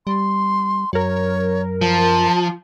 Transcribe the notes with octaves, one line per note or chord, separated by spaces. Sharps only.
G3 C6
F#2 F#3 A#4 C#5
F3 A5